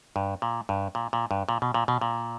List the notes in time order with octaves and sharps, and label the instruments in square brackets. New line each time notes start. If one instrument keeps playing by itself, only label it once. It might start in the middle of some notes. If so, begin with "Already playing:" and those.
[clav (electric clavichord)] G2
A#2
G2
A#2
A#2
G2
A#2
B2
A#2
B2
A#2